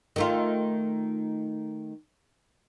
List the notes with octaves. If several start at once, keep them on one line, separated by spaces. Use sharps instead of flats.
D#3 A3 F4